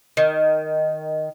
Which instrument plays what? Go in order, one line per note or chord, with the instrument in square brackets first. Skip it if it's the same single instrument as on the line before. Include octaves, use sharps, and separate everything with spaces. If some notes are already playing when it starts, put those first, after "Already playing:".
[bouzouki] D#3